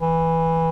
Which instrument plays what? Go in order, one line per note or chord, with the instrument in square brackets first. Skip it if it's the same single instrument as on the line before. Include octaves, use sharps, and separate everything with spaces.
[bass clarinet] E3